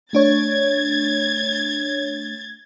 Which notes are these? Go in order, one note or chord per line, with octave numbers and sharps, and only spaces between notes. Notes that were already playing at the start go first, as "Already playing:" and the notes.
A3 D4 C#5 G#6 A6